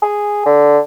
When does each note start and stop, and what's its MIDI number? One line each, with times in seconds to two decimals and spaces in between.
0.02 0.45 68
0.46 0.79 50